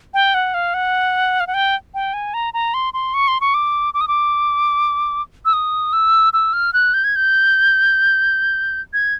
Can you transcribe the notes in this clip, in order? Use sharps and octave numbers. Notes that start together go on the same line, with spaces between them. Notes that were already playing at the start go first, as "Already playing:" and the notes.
G5
F#5
F5
F#5
F5
F#5
G5
G5
G#5
A#5
A#5
C6
C6
C#6
C6
C#6
D6
D6
D#6
D6
E6
D#6
E6
E6
F6
F#6
G6
G#6
G6
G#6